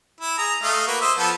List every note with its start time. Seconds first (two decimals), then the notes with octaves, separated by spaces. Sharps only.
0.20 E4
0.38 G#4 A#5
0.63 A3 D#5 F5
0.87 A#3 F#4 B4
1.01 C5 D#5 E5
1.18 F3 B3 A4